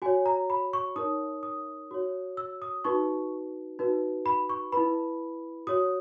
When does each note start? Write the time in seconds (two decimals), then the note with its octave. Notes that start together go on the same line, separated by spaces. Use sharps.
0.02 F#4 C#5 G#5
0.26 A#5
0.50 B5
0.73 C#6
0.96 D#4 A#4 C#5 D#6
1.43 D#6
1.91 F#4 C#5
2.37 E6
2.62 D#6
2.84 D#4 F#4 B4 C#6
3.79 D#4 F#4 B4
4.26 B5
4.49 C#6
4.72 E4 B4 B5
5.67 F#4 C#5 D#6